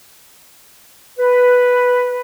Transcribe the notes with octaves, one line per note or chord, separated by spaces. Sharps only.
B4